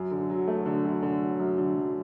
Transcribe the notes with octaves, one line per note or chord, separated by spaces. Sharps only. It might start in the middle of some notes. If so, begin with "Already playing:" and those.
Already playing: F#2
D3
F#3
A3
D3
F#2
D3
F#3
F#2
D3
F#2